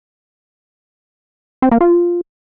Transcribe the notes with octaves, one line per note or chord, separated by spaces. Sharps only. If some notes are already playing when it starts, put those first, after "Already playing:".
C4
A#3
F4